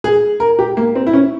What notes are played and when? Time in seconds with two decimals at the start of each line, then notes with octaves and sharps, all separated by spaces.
0.04 G#4
0.40 A#4
0.59 G4
0.77 A#3
0.95 C4
1.07 E4
1.13 C#4